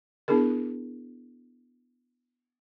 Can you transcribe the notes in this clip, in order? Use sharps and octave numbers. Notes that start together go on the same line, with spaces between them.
B3 D4 E4 G#4 A#4